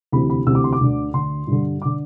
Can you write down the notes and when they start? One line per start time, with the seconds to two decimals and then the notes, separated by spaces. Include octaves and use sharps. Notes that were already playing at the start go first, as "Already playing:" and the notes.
0.12 D2 C3 E3 B5
0.30 B5
0.46 D2 C3 E3 E6
0.55 D6
0.64 C6
0.73 D6
0.80 D2 D3
1.14 D2 D3 C6
1.47 G2 D3
1.82 D3 D6